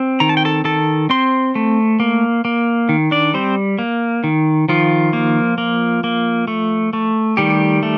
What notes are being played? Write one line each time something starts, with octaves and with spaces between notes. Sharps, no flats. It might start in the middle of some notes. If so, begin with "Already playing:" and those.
Already playing: C4
D#3 A#5
A5
G5
A4 A5
D#3 A4 A5
C4 C5 C6
A3
A#3
A#3
D#3
D4 D5
G3 C4 C5
A#3
D#3
D#3 F3 F4
A#3
A#3
A#3
A3
A3
D#3 G3 G4
A3